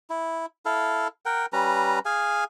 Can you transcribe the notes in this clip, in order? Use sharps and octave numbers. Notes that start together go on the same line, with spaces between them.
E4
E4 A4 F5
A#4 F#5 G5
G3 C#4 B4 A#5
G#4 F5 G#5